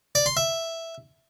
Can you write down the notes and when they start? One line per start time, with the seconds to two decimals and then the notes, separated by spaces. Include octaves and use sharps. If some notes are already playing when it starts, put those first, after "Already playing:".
0.15 D5
0.26 C6
0.37 E5